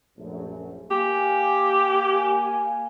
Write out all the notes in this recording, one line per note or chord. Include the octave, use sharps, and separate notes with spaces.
A#1 F#2 A3
A#3 G4 F5 G#5